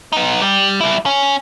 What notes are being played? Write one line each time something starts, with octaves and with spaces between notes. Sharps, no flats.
B3 D#4
G3
G3 E4
C#4